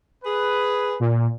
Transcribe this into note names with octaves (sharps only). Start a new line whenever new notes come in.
G#4 B4
A#2